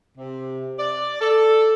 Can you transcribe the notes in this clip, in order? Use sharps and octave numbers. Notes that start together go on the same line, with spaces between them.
C3
D5
A4